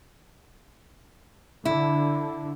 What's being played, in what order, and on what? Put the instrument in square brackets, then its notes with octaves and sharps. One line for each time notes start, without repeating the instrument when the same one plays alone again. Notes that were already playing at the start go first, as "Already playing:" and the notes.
[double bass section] D3 [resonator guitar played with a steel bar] E4